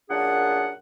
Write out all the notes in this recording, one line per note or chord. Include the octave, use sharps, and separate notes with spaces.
F#2 A#2 D4 G#4 F#5